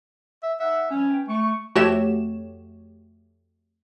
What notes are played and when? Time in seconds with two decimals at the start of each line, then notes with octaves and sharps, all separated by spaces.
0.43 E5
0.60 D#4 E5 F#5
0.90 F3 G3 C#4
1.10 B3 B4 G5
1.28 A3 C#6
1.75 F2 A3 F#4 G4 C#5 E7